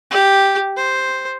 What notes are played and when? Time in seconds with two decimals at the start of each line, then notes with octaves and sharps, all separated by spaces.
0.11 G4
0.77 C5